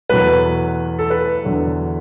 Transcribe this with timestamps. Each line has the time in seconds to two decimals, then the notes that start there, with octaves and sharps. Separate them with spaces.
0.10 E2 B2 F#3 A3 B4
0.99 A4
1.10 B4
1.44 E2 D3 F#3